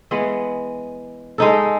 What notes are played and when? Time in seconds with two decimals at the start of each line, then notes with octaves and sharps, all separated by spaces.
0.11 E3 G#3 B3
1.38 G#3 D#4 A4